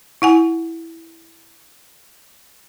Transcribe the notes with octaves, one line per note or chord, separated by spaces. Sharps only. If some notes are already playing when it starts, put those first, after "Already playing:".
E4 F#5 G#5